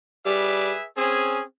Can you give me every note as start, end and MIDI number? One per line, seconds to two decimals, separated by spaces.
0.26 0.73 55
0.26 0.86 68
0.26 0.86 71
0.26 0.86 76
0.97 1.42 60
0.97 1.42 61
0.97 1.42 68